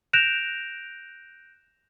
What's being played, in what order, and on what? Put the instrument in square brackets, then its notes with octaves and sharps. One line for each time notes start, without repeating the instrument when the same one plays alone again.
[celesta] F#6 G6 A#6 D7 E7 F7